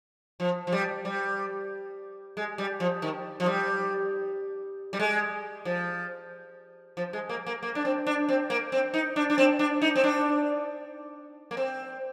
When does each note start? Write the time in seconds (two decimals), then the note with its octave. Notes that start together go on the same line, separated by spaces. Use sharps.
0.40 F3
0.67 F3
0.72 G3
1.05 G3
2.37 G#3
2.58 G3
2.80 F3
3.02 D#3
3.40 F3
3.46 G3
4.93 G3
4.99 G#3
5.65 F3
6.97 F3
7.13 G#3
7.29 A#3
7.47 A#3
7.63 A#3
7.75 D4
7.85 C4
8.07 D4
8.29 C4
8.50 A#3
8.72 C4
8.94 D#4
9.16 D4
9.30 D4
9.38 C4
9.59 D4
9.82 D#4
9.96 C4
10.04 D4
11.51 A#3
11.57 C4